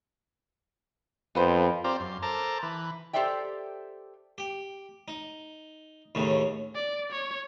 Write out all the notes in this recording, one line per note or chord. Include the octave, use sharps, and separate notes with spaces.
F2 B3 B4 C5
C4 F4 G4 A#4 C5 D5
F#2 C6
A4 A#4 C5 A5 A#5 D6
E3 B4
G4 A4 C5 D5 E5 G5
G4
D#4
D#2 A2 C#3
D5
C#5